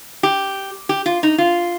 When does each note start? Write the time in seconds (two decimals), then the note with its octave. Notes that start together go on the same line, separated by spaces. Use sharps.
0.23 G4
0.89 G4
1.06 F4
1.23 D#4
1.38 F4